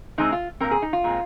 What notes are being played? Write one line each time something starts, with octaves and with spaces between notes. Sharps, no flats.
C3 G#3 C4 D#4
F4
A#2 G#3 C4 A#4
G#4
D#4
F4
A#2 G#3 C4